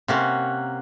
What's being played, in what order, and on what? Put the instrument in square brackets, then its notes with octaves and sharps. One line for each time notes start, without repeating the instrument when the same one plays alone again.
[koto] C3 A#3 C#4 [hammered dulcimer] A#4 F#5 C6